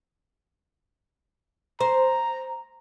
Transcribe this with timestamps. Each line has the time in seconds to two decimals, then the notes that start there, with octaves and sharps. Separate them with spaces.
1.80 C5 A#5